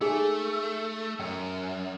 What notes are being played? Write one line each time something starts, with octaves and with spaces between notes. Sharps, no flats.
A3 D#4 G#4 G#5
F#2 G5